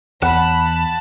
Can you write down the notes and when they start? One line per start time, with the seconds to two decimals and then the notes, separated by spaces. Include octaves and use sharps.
0.22 E2 F#5 A5 B5